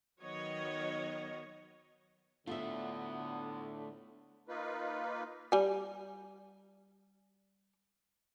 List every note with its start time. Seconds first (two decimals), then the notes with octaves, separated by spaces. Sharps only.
0.21 D#3 F#3 B3 C#5 D#5
2.47 A2 D3 A3 B3 D4 F4 E5
4.49 A#3 D#4 F4 B4
5.52 G3 G#5